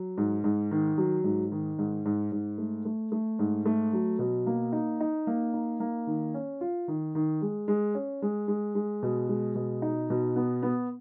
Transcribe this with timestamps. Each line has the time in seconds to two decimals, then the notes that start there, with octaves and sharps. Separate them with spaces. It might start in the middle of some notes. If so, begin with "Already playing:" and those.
Already playing: F#3
0.17 G#2
0.44 G#2
0.71 D#3
0.98 F#3
1.24 G#2
1.52 D#3
1.79 G#2
2.05 G#2
2.32 G#2
2.58 A3
2.85 A3
3.12 A3
3.39 G#2
3.66 A3
3.93 F#3
4.19 B2
4.46 A#3
4.72 D#4
5.00 D#4
5.27 A#3
5.54 D#4
5.80 A#3
6.07 D#3
6.34 C#4
6.61 F4
6.88 D#3
7.15 D#3
7.42 G#3
7.68 G#3
7.95 C#4
8.22 G#3
8.48 G#3
8.75 G#3
9.03 B2
9.28 G#3
9.55 B2
9.82 D#4
10.10 B2
10.36 B3
10.63 B3